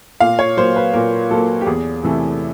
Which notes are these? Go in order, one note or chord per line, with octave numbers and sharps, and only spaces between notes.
A#2 F5
C#5
F#3 A#3 C5
B4
A#2 A#4
F#3 A#3 A4
G4
E2 G#4
C3 E3 A3